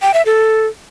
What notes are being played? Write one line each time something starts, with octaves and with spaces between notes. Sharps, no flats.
G5
E5
A4